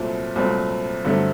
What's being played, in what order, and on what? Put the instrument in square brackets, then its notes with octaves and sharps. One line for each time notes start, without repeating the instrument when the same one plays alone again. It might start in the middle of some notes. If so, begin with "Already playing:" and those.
Already playing: [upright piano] C2 A#2 F#3 A3 C4
C2 A#2 F#3 A3 C4
G2 D3 F#3 A3 C4